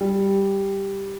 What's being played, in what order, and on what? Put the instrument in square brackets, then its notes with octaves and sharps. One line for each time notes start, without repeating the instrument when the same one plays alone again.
[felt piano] G3